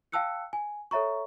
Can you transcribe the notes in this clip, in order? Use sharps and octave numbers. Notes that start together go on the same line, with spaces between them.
F5 G5 A5 E6 F#6 C#7
G#5
A4 C#5 E5 A#5 C#6